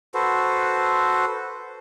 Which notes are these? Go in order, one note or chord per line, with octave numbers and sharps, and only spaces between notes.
F#4 A4 B4 C5